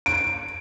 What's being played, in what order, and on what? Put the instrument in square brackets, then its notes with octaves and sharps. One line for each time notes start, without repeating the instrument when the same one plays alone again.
[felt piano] D7